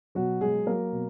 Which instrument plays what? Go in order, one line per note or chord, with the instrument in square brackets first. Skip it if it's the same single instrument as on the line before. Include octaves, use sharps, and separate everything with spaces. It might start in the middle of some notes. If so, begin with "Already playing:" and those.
[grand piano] B2 F#3 F#4
F#3 G#3 G#4
F#3 A#3 A#4
B2